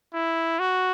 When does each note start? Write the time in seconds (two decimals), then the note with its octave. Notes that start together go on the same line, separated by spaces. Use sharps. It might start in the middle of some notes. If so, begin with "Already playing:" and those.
0.14 E4
0.59 F#4